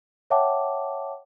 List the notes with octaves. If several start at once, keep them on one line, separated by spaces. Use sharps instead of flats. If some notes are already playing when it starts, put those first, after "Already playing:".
C#5 E5 F#5 G5 A5 D6